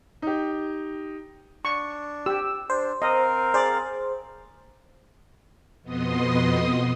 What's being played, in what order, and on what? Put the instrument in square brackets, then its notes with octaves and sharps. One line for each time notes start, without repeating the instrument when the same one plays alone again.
[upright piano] D#4 G4
[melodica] D4 [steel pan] C#6
[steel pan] G4 [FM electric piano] E6
[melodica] D4 [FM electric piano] C5
[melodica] C4 A#4 F5 [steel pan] D#5
[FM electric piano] G#4 C5 [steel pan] D5
[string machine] F2 B2 B3 D#5 C6 D#6